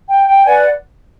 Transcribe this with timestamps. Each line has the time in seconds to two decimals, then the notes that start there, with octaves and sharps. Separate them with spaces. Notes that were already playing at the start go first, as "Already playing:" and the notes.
0.09 G5
0.27 G5
0.46 B4 D5 F#5 G#5